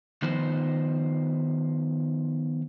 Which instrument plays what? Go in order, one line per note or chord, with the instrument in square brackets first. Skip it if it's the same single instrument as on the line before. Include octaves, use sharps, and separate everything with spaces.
[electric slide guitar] D#3 F3 B3 D#4 C5